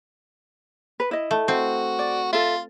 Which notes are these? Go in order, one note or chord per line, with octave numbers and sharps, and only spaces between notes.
B4
E4 D#5
A3
C4 F#4
D5
F4 A4 E5